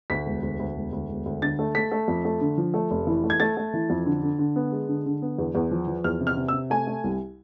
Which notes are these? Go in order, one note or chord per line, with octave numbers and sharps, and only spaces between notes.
D2 B6
E1
D2
D2
E1
D2
E1
D2
D3 A6
A3
A3 B6
A3
F2
A3
D3
F3
A3
F1
E3
A3
G#6
A3 A6
A3
E3
F2
D3
D3
D3
B3
G#3
D3
D3
B3
E2
E2
F3
F3
E2 F6
C3
F6
C3
E6
C3
A3 G#5
A3
C2